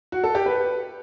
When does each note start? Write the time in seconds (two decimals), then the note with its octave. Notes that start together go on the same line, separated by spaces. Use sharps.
0.12 F#4
0.24 A4
0.35 G4
0.46 B4